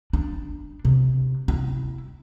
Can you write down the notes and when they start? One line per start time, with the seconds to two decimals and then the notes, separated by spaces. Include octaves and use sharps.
0.13 D4
0.85 C3
1.48 E4